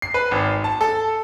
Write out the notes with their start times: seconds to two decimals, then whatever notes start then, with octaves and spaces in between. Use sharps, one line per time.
0.02 C7
0.14 B4
0.31 G#1
0.64 A5
0.81 A4